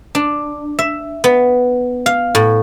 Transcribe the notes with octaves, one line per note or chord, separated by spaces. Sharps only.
D4
E5
B3
F5
A2